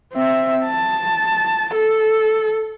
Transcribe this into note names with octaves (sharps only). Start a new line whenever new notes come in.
C4 E5
A5
A4